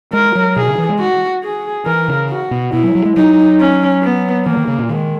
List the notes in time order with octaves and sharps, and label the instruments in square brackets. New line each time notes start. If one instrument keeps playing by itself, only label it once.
[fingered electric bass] G#3 [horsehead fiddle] A#4
[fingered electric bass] F#3
[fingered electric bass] B2 [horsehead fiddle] G#4
[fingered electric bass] C#3
E3
G#3
[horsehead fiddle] F#4
G#4
[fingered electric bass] E3 [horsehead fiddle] A#4
[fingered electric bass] C#3
[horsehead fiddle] F#4
[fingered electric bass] B2
[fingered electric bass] B2 [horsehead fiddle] E4
[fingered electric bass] F#3
F#3
G#3
[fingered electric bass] F#3 [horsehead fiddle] D#4
[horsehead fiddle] C#4
B3
[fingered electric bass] E3 [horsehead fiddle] A#3
[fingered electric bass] D#3
C#3
A#2
[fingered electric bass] D#3 [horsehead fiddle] G#3